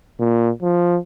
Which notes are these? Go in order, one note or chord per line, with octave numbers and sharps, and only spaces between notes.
A#2
F3